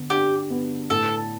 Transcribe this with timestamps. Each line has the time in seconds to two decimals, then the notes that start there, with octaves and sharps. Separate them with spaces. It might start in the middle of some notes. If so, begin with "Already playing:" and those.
Already playing: D3 B3
0.10 D4 G4
0.50 B3
0.90 A2 A4